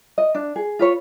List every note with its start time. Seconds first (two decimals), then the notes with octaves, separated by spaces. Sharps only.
0.18 D#5
0.35 D4
0.56 G#4
0.79 F4 B4 C#5